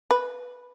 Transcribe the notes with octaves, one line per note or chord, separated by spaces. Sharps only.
B4